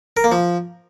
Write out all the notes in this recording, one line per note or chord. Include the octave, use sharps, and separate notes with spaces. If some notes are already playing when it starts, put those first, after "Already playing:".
A#4
A#3
F3